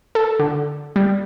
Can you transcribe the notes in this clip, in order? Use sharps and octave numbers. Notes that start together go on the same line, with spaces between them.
A4
D3
G3